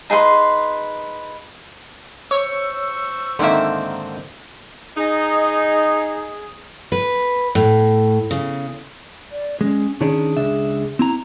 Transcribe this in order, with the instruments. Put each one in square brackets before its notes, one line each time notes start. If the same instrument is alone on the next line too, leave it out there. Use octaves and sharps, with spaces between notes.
[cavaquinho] D#4 G#4 B4 C6
[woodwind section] C5 C#6 E6 [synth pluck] C#5
[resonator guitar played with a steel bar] G#2 C4 E5 [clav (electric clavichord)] D3 D#3 A#3
[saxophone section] D#4 [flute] G#4
[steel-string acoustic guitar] B4
A2
C#3
[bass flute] D5
[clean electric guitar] G#3 [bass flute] C#4
[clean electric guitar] D#3 C#4 D4 [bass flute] G#4
[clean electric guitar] C#2 D4 E5
C4 E4 A#5